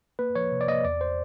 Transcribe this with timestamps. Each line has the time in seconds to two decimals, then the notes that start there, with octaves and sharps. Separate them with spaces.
0.19 A#3 B4
0.35 F3 C#5
0.52 C3
0.61 D5
0.68 A#3 D#5
0.85 E2 D5
1.01 C5